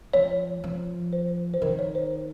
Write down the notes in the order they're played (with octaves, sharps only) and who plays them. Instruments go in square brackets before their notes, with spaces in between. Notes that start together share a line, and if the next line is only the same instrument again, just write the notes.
[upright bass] F3 [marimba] C#5
[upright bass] F3
[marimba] C5
C5
[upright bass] D#3 [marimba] A#4
[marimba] C#5
C5